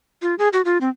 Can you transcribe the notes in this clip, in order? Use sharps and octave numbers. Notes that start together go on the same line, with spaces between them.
F4
G#4
F#4
F4
C4